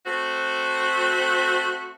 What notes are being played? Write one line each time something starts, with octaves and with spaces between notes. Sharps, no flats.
A3 C4 F#4